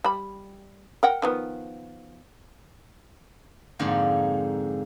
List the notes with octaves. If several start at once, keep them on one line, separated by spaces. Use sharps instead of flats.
G3 B5
A#4 F#5 G5
D#3 F3 B3
F2 G#2 D3 A#3